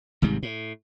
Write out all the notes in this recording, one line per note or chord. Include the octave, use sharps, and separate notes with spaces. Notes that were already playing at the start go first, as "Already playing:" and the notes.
G#1 G#2 C3 G3
A2